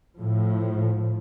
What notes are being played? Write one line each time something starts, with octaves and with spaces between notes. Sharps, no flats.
A2 F3